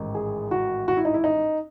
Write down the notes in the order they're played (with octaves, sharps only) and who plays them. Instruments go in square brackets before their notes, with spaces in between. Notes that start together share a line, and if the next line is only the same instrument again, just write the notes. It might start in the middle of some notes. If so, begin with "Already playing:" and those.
Already playing: [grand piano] A1 G#2 D#3
G#4
F#4
F#4
E4
D#4
E4
D#4